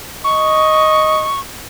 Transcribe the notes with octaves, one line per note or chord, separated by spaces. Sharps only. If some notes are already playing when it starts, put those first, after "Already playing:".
D#5 C#6